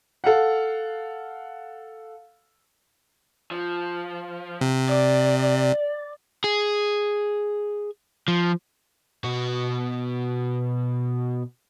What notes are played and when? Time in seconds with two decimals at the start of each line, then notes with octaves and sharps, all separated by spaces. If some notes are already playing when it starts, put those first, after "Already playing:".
0.24 A4 F5 F#5
3.51 F3
4.61 C3
4.89 D5
6.44 G#4
8.28 F3
9.24 B2 F#4